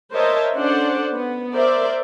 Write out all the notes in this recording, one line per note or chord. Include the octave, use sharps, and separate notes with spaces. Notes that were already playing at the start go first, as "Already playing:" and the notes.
A#4 C5 C#5 D#5 E5 A5
C#4 D4 A4 C5 D5 F#5
B3
A#4 C5 D5 E5